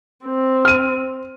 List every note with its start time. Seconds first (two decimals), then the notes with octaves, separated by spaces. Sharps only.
0.25 C4
0.65 F6 D#7